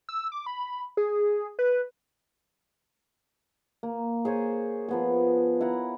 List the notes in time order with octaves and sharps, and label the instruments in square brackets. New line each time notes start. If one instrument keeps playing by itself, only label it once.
[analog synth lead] E6
D6
B5
G#4
B4
[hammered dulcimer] A#3
G#4 C5 C#5 G#5
F3 B3 G#4
E4 F#5 A#5